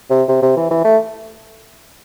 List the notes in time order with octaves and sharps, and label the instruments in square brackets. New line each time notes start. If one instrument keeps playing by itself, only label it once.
[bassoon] C3
C3
C3
E3
E3
A3